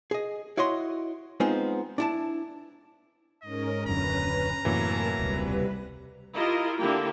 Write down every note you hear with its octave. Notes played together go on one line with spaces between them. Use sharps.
G#4 D#5
E4 F#4 C#5 D#5 C6
G#3 B3 C4 D#4 F4
D4 E4 A5
G#2 C#4 A#4 D#5
D#1 F#2 D3 C#4 B4 A#5
F#2 A2 C3 E3 F#3 A#3 A#4 A5
E1 C#2 C3 G3 B4
E4 F4 G4 A#4 D#5
D3 A#3 E4 G4 G5